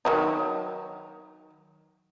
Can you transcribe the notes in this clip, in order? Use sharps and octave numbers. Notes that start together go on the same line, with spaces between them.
D#3 F#3 D#4